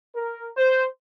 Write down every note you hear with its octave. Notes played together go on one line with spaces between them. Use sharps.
A#4
C5